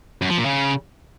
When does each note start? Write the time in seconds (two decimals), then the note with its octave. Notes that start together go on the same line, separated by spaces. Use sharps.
0.22 F#2
0.30 F3
0.38 A#2
0.46 C#3